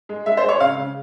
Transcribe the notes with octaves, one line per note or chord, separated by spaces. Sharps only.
G#3
G#3 E5
C5
G#3
C#5
C#3 F5
C#3